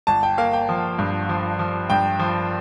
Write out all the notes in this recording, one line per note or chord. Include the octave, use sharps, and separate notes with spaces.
G1 A5
G5
A#3 F5
G5
F3
G2
F3
F3
G2 G5
F3